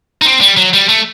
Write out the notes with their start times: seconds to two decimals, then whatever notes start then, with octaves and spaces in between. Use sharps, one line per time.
0.22 D#4
0.25 C4
0.41 G3
0.57 F#3
0.74 G3
0.89 A3